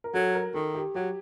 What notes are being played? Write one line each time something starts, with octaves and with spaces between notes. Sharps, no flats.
A#4
F#3 A4
A#4
D#3 A4
G4
F#3 G4